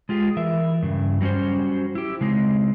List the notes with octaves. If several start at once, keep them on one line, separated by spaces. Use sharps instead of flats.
G#3 F4 G4 G#4
E3 A#4 E5
G2 C#3
F#3 G3 C#4 F#4 C5
E4 G4
C#3 G#3 C4 D#4